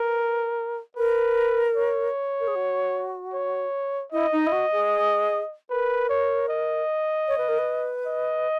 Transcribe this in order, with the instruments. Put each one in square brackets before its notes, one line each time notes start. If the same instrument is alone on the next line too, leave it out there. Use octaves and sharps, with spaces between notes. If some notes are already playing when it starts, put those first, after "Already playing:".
Already playing: [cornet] A#4 [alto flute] B4
[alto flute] A#4 [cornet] B4
[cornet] C#5
[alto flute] A#4
G#4
F#4
[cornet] C#5
[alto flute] E4 [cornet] D#5
[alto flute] D#4
E4
F#4
G#4
[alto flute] A#4 [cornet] B4
[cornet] C#5
D#5
[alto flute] C#5
B4
A#4
B4
[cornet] D#5